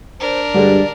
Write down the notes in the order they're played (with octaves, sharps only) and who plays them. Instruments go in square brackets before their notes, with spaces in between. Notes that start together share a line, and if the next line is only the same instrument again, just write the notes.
[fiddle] D4 A#4 [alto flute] C5
[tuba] G2 [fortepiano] D3 G3 G#3 [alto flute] D5